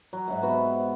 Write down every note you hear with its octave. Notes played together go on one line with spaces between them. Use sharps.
F#3
G#2 F#3 E5 F#5
C3 B3 F#4 B4